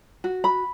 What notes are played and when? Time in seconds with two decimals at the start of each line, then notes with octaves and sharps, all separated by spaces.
0.24 F#4
0.44 B5